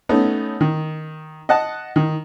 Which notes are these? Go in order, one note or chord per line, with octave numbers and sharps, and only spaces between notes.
A3 B3 C#4 D#4
D#3
D#5 F#5 A5
D#3